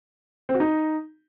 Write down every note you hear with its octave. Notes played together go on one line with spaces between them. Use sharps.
C4
F#4
D#4